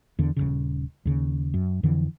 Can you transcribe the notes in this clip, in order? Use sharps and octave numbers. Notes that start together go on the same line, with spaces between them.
E2 D3
D#1 A#1 C#3
D#2 C#3
F#2
F2 D3 E3